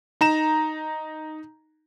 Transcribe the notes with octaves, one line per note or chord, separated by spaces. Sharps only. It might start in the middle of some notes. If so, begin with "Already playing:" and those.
D#4 A#5 E7